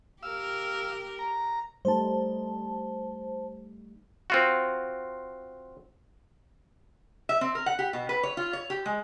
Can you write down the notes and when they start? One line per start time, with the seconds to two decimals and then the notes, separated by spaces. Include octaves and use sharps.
0.23 G4 A#4 F5 E6
1.19 A#5
1.85 G3 A3 D#4 C5 A5
4.30 C4 F4 F#4
7.29 E5
7.41 C4
7.55 A#4
7.66 F#5
7.79 G4
7.93 B2
8.09 B4
8.23 C#5
8.37 F4
8.53 C#5
8.70 G4
8.86 G#3